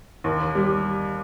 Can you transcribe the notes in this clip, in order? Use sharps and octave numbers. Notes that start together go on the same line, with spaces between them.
D#2
G3